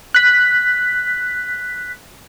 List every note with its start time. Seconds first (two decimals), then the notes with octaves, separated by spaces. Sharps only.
0.15 F#6 B6